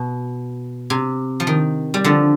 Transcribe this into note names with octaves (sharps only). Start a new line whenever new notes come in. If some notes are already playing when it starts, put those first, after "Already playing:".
Already playing: B2
C3
F3
D#3
G3
D3 F3